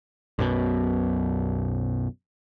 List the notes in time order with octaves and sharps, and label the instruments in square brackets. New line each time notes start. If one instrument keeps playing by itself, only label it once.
[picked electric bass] B1 F#2 B2